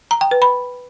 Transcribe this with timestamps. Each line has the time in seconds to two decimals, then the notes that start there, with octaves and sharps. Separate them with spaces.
0.11 A#5
0.21 G5
0.31 B4
0.42 B5